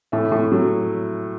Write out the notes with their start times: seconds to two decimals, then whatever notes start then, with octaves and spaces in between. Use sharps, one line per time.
0.12 A2 E5
0.31 A2
0.52 F#3